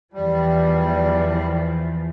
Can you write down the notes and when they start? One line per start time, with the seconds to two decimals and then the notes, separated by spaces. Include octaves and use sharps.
0.13 E2 F3 G3